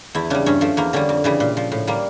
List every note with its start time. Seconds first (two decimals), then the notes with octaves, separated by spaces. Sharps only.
0.15 E2 E4
0.30 C#3 G3 D4
0.46 G2 C#4
0.61 F3 A3
0.77 E2 A#3
0.93 D3 G3 C#4
1.09 F2
1.24 C#3 E3 G3
1.40 A#2
1.57 F3
1.72 A2
1.87 G3 A#3